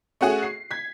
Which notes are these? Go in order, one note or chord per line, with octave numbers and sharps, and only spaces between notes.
A3 C#4 F#4 G#4
C7
G#6 B6